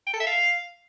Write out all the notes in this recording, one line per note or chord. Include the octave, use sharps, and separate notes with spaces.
G5
A4
E5
F5